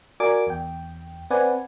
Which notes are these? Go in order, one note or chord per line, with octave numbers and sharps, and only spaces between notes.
F#4 A#4 D5 G#5 D6
E2 G5
C4 B4 D5 F#5 G#5